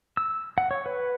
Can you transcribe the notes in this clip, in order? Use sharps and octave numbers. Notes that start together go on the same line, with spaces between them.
E6
F#5
C#5
B4